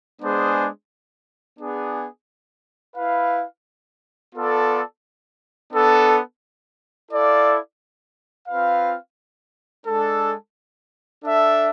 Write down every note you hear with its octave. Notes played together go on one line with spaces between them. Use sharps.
G#3 B3 D4 G#4 C5
B3 D4 G#4
E4 B4 F5
B3 F4 A4 D5
B3 D4 A4
E4 A4 D5 F5
C4 F4 B4 F5
G#3 D4 A4
D4 A4 E5